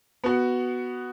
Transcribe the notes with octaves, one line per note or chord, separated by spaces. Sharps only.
B3 F#4